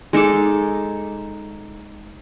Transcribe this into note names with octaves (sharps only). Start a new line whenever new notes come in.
G#3 D#4 A4 D6